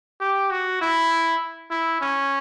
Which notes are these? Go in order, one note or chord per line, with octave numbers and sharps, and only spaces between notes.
G4
F#4
E4
E4
C#4